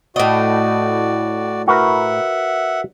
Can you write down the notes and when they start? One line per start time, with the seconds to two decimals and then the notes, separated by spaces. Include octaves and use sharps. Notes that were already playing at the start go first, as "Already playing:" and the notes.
0.16 A2 F#4 D5 D#5
1.67 F#4 A#4 B4 E5 F#5